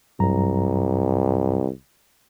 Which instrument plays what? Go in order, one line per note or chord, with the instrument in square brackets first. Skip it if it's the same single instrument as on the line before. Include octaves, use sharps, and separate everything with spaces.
[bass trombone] C2 [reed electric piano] G2 F#3 A#5